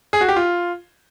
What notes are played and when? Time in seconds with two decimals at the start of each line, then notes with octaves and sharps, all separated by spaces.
0.13 G#4
0.21 F#4
0.29 G4
0.36 F4